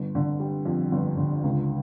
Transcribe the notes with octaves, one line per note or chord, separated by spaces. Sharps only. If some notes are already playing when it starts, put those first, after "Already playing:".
Already playing: G1
D3
G3
F2
G1
D3
C#2